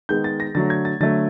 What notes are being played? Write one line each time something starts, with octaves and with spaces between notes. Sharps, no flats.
D#3 G#3 B3 G6
A6
A#6
D3 F#3 A3 A6
G#6
A6
D3 F#3 A3 A6